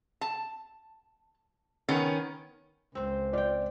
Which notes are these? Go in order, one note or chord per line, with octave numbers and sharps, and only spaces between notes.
A5
D#3 B3 C#4
C#2 C4 C5
F4 D5 G5